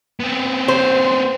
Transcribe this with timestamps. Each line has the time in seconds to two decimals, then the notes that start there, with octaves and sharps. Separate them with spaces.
0.20 B3 C4
0.68 C5